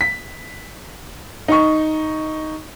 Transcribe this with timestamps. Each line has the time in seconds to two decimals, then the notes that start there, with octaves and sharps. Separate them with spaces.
0.01 B6
1.48 D#4 C#6